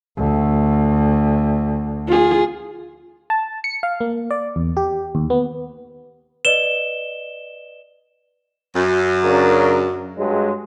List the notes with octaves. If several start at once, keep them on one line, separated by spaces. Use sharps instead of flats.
D2
F4 G#4
A5
C#7
F5
A#3
D5
E2
G4
D#2
B3
B4 D5 D#5 E7 G7
F#2
C#3 D4 A#4
G2 F#3 G#3